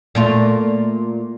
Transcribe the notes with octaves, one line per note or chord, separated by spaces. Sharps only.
A#2 A3 F4